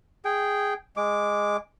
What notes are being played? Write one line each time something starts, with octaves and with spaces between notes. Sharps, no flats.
G#4 G5
G#3 D6